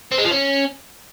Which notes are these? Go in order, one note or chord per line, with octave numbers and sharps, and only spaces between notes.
C4
G#3
F3
C#4